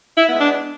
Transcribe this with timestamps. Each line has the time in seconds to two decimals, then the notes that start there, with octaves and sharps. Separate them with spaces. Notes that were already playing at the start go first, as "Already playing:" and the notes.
0.17 E4
0.28 G#3 B3
0.40 D4